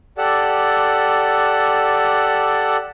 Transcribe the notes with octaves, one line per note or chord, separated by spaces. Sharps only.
G4 A4 D5 F#5 E6